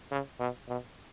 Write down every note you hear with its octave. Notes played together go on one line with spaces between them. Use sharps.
C#3
B2
B2